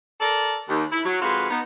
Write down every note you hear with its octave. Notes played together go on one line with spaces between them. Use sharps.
A4 A#4 D5
D#2
E4
F#3
F2 G#3 F#4 B4 C5 F5
B3 D#4